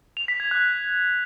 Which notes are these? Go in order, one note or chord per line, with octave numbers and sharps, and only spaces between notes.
F7
B6
G#6
F#6